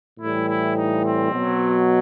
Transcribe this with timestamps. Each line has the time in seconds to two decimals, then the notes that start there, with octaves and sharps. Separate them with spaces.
0.19 A2 E3 G3 E4
0.48 E4
0.77 D#4
1.05 C4
1.33 B2 F#3